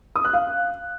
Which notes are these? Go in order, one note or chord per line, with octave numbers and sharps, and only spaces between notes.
D#6
F#6
F5